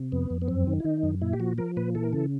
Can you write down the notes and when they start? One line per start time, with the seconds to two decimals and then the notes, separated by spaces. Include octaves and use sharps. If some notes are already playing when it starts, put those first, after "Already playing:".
Already playing: C3
0.12 F2 B3
0.30 F2
0.42 B3
0.48 F#2 C4
0.67 D#3
0.80 E4
0.84 D#3 D#4
1.03 F#2
1.22 A#2 E4
1.33 G4
1.40 F3 F#4
1.58 F3 A#4
1.77 A#2 B4
1.95 E3 A4
2.04 A#4
2.12 C#3 A4